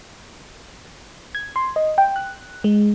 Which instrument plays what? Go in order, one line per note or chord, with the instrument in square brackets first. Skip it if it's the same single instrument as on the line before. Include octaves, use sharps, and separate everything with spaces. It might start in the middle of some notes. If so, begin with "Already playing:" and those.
[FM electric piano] G#6
C6
D#5
G5
F#6
G#3